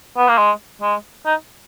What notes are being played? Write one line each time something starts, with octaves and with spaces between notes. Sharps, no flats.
B3
A#3
G#3
G#3
D#4